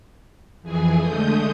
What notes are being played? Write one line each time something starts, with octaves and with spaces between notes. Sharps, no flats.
F2 E3 G#4 G#5
D3 G#3 A3 D#6 G6